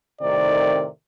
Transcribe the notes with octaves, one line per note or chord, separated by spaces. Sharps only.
A2 C3 D#3 D5